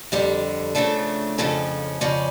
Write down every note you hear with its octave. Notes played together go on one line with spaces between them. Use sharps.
F2 D3 G3 G4
C#3 F3 A3 D4 A4
F2 C#3 F3 C#4 A4
F2 C#3 F3 C#4 D5